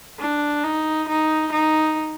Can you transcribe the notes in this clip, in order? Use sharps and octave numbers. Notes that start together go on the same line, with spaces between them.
D4
D#4
D#4
D#4